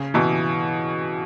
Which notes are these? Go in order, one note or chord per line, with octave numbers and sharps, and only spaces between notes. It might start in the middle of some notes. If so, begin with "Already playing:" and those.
Already playing: C#3
B2 E3